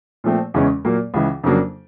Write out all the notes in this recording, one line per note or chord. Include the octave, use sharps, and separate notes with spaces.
A#2 F3 A3 C4
E2 C#3 E3 G#3 C#4
A#2 F#3 A#3
C#2 C#3 E3
F2 C#3 F#3 A#3 D4